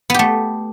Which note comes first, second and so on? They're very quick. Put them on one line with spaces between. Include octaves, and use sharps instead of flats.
B3 G4 A3